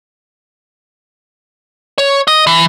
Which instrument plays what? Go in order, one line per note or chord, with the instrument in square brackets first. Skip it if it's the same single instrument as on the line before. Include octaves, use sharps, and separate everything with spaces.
[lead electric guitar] C#5
D#5
E3